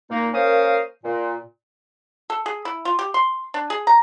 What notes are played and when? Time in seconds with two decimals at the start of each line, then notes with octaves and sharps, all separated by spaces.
0.10 A#2 A#3 D#4
0.33 A#3 C#4 A#4 C5 F5 D#6
1.04 A#2
2.30 A4
2.46 G#4
2.65 E4
2.85 F4
2.99 G4
3.14 C6
3.54 D4
3.70 G#4
3.87 A#5